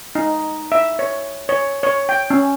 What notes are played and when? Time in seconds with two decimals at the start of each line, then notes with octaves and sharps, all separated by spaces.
0.15 D#4
0.72 E5
0.99 C#5
1.49 C#5
1.83 C#5
2.09 G5
2.30 C#4